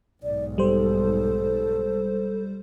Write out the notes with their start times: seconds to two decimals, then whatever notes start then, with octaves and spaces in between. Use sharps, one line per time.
0.23 B1 G#2 D5
0.58 G3 A4 C5